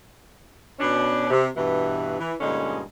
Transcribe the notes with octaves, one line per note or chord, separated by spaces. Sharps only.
B2 C#4 D4
C3
G2 B2 E3
E3
G2 A#2 D3 G#3 C#4 D#4